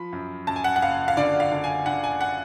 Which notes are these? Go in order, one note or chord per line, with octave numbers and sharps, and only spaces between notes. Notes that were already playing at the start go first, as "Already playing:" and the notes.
Already playing: F3 B5
F#2
F#2 A5
G#5
F#5
F#5
F#1 F5
F5
D3 D5
F5
D3
G#5
D3 F#5
G#5
F#5